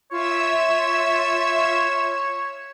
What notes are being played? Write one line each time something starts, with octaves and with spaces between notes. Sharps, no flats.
F4 C#5 E5 E6